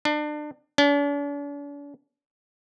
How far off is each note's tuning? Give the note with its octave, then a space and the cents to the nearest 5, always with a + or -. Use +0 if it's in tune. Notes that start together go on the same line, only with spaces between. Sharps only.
D4 +30
D4 -45